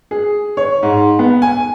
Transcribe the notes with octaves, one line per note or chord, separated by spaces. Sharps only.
G#4
C#5
G#2
B3
G#5